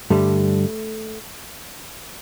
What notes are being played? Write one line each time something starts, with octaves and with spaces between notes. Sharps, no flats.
G2 D3 G3 A3